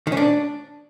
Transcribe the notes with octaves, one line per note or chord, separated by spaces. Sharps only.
D#3
C#4
D4